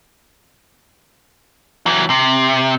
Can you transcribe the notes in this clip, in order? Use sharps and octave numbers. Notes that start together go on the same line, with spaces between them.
E3 F#3
C3